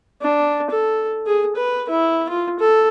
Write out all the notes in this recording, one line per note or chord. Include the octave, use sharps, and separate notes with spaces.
D4
A4
G#4
B4
E4
F4
A4